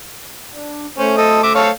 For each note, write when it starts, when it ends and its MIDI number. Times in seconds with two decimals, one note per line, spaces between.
0.53 0.86 62
0.98 1.71 57
0.98 1.14 61
0.98 1.71 72
1.18 1.41 69
1.18 1.41 75
1.43 1.53 76
1.43 1.53 86
1.55 1.69 69
1.55 1.69 73
1.55 1.69 77